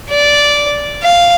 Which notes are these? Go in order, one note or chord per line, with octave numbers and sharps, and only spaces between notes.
D5
F5